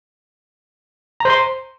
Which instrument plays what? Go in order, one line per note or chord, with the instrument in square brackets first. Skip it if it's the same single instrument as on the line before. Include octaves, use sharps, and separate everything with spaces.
[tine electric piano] A#5
C5
C6